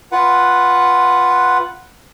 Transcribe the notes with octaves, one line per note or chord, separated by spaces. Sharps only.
F4 B4 F#5